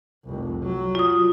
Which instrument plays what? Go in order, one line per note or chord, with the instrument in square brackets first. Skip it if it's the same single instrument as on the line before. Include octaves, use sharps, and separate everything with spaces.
[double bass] F1 C2
F#3
[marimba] F4 D#6